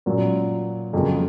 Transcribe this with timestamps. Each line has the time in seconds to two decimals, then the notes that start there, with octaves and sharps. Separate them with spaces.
0.06 A#2 F#3 C#4
0.93 F2 C#3 F#3 A#3 C#4